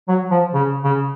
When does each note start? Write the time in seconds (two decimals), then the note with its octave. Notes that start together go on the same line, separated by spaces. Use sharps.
0.08 F#3
0.31 F3
0.54 C#3
0.84 C#3